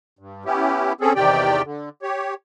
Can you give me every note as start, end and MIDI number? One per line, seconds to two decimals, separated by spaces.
0.19 0.44 43
0.45 0.93 59
0.45 0.93 61
0.45 0.93 64
0.45 0.93 67
1.01 1.13 60
1.01 1.13 61
1.01 1.13 68
1.01 1.13 69
1.16 1.62 40
1.16 1.62 48
1.16 1.62 51
1.16 1.62 67
1.16 1.62 74
1.16 1.62 79
1.65 1.89 50
2.02 2.34 67
2.02 2.34 73